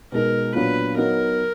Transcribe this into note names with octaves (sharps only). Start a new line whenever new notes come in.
B2 G#3 D#4 A#4
A#2 F#3 B3 D4 B4
F#3 B3 D#4 A#4